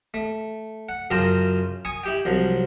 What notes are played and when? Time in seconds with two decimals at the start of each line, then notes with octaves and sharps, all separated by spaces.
0.14 A3
0.89 F#5
1.11 F#2 C#3 F4 G5 A5 A#5
1.85 G#5 C#6 D#6
2.04 E4 G4 G5
2.25 C2 F3 F#3